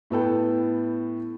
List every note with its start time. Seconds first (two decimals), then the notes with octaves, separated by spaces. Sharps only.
0.10 A2 B3 A4 G5